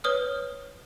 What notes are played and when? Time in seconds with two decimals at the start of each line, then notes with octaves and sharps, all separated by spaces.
0.04 B4 C#5 D#6 F6